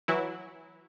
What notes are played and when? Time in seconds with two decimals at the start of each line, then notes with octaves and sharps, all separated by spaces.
0.08 E3 F#3 E4